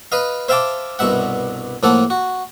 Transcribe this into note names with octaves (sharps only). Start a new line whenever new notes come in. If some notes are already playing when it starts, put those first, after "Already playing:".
B4 D#5 F5
C5 E5 F5 G5 A5 D6
C2 G2 B2 E5 F#5
A2 F3 A#3 A4 F#5
F#4